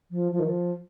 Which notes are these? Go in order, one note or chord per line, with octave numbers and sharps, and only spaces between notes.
F3
F3
D#3
F3